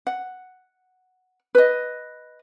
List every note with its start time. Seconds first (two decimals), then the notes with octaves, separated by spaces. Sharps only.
0.07 F#5
1.55 B4 D#5